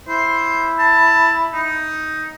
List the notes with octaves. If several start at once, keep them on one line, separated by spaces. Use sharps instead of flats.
E4 C5
A5
D#4